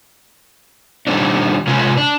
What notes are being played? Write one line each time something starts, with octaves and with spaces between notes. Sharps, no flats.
D#3 G3 C4 D4
C3 G#3 C#4 F4 B4
D4